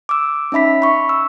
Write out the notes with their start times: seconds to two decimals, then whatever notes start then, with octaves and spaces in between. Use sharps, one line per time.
0.09 D6 E6
0.52 C#4 D#4 E5 B5 B6
0.82 B5 C#6
1.09 E6